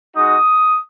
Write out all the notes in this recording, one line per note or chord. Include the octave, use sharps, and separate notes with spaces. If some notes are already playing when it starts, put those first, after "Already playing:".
G#3 D#4 F#4 D#6